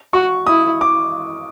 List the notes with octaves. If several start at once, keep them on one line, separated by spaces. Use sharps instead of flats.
F#4 C#6
E4 D#6
D6